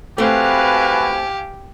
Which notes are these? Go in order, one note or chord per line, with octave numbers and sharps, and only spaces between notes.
G#1 A3 C4 F#4 G4 B4 F5 G#5